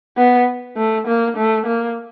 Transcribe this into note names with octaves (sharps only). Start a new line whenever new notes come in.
B3
A3
A#3
A3
A#3